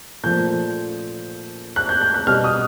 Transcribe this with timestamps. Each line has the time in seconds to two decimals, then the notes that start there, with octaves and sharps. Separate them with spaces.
0.24 A#2 F3 A3 G6
1.76 F#6
1.89 G6
2.01 G6
2.14 F#6
2.27 B2 G3 F6
2.44 D#6